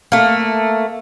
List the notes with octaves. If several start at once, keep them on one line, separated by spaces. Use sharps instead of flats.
A3 A#3